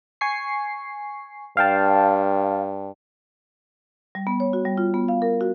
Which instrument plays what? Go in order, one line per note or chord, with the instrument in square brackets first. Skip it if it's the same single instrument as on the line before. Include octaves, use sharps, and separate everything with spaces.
[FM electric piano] G#5 C#6 C7
[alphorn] G2 [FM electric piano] F5 G5 A5
[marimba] G3
B3
C#5
F#4
G3
F4
B3
F5
A#4
F#4